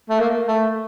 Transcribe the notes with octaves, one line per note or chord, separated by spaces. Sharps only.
A3
A#3
A3